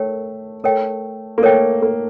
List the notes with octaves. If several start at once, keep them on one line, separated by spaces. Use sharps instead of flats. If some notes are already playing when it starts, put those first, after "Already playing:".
Already playing: A3 A#4 C#5 G5
A3 A#4 C#5 G5
A#3
A3 A#4 C#5 G5
A#3